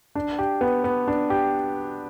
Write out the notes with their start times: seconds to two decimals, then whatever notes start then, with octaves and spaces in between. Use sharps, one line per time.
0.15 D4
0.39 G4
0.61 B3
0.84 B3
1.08 D4
1.30 G4